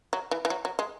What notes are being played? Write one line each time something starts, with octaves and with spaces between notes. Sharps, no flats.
F#3
E3
E3
F#3
F#3
G#3